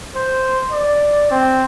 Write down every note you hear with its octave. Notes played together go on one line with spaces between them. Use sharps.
C5
D5
C4